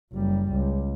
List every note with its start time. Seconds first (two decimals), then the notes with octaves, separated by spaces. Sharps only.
0.13 F#1 G3
0.51 C#2